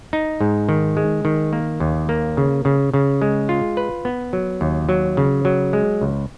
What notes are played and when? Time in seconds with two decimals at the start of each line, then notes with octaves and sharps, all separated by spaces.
0.13 D#4
0.41 G#2
0.69 D#3
0.97 G#3
1.25 D#3
1.53 A#3
1.80 D#2
2.09 A#3
2.37 C#3
2.65 C#3
2.94 C#3
3.22 G#3
3.49 F4
3.77 B4
4.05 B3
4.33 F#3
4.61 D#2
4.89 F#3
5.17 C#3
5.45 F#3
5.73 G#3
6.01 C#2